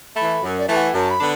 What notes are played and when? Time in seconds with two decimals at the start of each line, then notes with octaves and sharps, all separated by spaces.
0.16 E3 A3 B5
0.43 F#2
0.59 D5
0.69 E3 A3 A5
0.76 F#5
0.94 F#2 A5
1.10 B5
1.19 D3 B3 D4